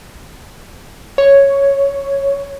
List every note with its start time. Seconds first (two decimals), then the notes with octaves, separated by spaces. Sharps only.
1.18 C#5